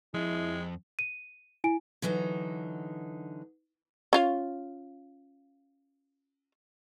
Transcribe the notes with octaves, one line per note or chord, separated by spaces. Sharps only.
F2 G#3 E4
D#7
E4 G#5 D7
D3 E3 F#3 D#4
C#4 F4 F5